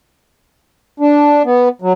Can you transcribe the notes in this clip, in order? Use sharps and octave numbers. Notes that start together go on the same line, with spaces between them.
D4
B3
F#3